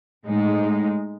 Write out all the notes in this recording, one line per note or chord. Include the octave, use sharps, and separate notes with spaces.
A2 G#3 D#4